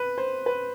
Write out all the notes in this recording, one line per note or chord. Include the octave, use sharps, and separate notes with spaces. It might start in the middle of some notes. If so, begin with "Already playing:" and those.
Already playing: B4
C5
B4